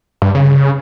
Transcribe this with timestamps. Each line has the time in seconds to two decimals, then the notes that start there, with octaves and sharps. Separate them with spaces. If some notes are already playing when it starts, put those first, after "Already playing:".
0.22 G2
0.35 C#3